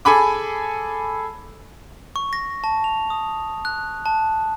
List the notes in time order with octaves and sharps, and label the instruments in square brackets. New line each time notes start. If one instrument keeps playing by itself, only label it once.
[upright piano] G#4 A4 G#5 B5 D6
[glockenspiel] C#6
A#6
A5
F7
D#6
F#6
A5